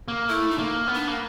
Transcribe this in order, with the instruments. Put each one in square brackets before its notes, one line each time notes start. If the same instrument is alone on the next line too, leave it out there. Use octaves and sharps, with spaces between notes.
[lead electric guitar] A#3
[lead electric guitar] A3 [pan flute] E4
[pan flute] D#4
[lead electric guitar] A#3
B3
[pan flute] D4
[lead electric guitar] A#3